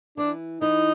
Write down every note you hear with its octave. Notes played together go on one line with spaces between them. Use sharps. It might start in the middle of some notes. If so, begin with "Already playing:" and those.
E3 D4
E3 D#4